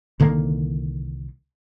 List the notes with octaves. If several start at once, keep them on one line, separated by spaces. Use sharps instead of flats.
C2 D3 D#3 A#3